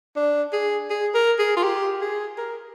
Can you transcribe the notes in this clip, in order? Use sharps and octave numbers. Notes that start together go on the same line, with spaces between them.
D4
G#4
G#4
A#4
G#4
F4
G4
G#4
A#4